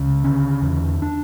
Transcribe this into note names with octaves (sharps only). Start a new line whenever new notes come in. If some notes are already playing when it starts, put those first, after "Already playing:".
Already playing: C#2 C#3
D3 C#4
E2
D4